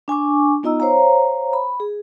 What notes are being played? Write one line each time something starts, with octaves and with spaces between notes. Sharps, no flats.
D4 G#5 C#6 D6
B3 D#4 F4 D#5 A#5 E6
C5 C#5 F5 A#5
B5
G#4